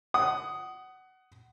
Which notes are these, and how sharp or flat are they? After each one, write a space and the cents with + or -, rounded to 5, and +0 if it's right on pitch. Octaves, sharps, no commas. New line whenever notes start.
F#5 +20 D#6 +0